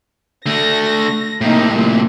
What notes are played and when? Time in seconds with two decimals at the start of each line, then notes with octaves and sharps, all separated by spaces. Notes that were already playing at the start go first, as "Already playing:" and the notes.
0.46 D3 A3 A#6
1.41 A2 C3 A#3 D#4
1.73 A#2 G3